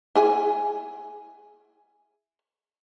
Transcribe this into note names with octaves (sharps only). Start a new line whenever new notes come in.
E4 G#4 G#5